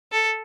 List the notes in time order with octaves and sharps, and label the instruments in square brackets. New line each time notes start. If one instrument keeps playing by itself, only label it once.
[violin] A4